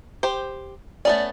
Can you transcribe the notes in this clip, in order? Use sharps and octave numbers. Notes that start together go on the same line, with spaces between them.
G4 C5
A3 B3 C#4 D5